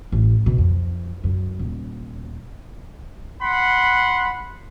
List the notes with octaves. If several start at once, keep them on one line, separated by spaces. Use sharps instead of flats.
A1
B2
F2
F#2
D#1
F#5 B5 C6